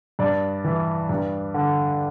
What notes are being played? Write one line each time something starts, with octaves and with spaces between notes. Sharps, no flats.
G2 D5
E3
G2
D3